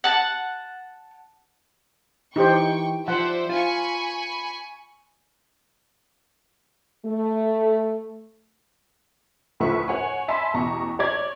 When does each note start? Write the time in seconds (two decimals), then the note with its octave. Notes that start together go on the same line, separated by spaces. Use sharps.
0.04 F#5 A5
2.36 E3 D#4 G4 C5 G5 C#6
3.08 F3 C5 D5 E5 F#5
3.49 F4 G#5 B5 C#6
7.06 A3
9.60 D2 A2 F3 B4 E5 C#6
9.88 C#5 F#5 G#5
10.28 E5 G#5 A5 B5 C6
10.54 A1 E2 B2 A#5 C#6
10.99 C#5 D5 G#6